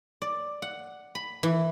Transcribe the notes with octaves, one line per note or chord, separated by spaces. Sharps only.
D5
F#5
B5
E3